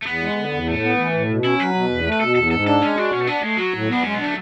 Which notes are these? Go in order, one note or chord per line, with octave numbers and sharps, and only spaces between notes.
A3
E2 B3
G#3
D3
E2
A2 A3
B3
E3
A2
B2
C#4 E4
F#3 B4
B2
E2
A3
B4
B2 A4
E2 A4
G#2 A4
D4 A4
G#3 C#4
D4 F#4
B2 C#4
A3
B3 D4
G#3 A3
F#3 F#4
A2
B3 D4
G#3 C#4
B3
A3 D4